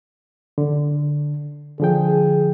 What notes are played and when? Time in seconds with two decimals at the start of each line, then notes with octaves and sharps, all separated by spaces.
0.58 D3
1.80 D3 F3 G#4 G5